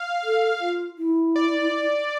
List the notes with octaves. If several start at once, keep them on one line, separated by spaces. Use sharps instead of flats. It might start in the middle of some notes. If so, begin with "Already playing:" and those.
Already playing: F5
A4
F4
E4
D5